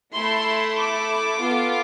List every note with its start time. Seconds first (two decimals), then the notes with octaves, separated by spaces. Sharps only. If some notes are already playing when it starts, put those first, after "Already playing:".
0.13 A3 E4 A4 C6
0.77 D6
1.40 B3 F4 A4